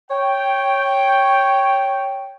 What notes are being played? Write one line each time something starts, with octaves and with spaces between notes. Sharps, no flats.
C#5 G5